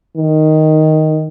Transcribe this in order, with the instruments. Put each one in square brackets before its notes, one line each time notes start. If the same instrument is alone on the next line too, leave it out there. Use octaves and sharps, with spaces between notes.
[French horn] D#3